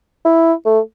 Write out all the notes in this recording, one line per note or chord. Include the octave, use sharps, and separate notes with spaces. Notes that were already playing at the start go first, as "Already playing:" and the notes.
E4
A3